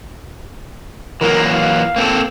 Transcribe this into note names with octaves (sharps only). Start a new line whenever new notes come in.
E3 F#3 A#3 A#4
F5
A#3 C4 A4